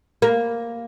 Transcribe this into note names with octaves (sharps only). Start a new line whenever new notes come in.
A#3